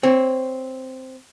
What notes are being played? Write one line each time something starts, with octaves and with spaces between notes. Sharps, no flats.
C4 C#5